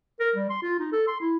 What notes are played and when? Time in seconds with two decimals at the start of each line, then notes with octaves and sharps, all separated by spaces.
0.20 A#4
0.35 G3
0.50 C6
0.62 F4
0.79 D#4
0.92 A4
1.07 C6
1.21 E4